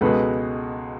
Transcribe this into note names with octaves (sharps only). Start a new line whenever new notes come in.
C#2 B2 G#3 A4 B4